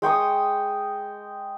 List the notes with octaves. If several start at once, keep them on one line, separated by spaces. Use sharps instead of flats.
G#3 G5 C#6 D#6